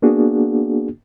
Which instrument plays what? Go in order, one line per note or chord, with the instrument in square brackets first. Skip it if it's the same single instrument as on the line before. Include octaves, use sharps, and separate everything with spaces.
[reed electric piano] A#3 B3 D4 F#4 G#4